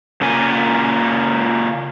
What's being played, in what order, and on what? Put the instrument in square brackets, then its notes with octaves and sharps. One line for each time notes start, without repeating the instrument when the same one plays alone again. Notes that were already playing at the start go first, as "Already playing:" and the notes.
[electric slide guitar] C#3 A#3 F4 G#5